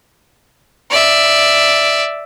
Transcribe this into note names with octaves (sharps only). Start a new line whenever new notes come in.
D5 E5